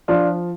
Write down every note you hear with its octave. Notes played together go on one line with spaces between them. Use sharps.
F3 D4 F4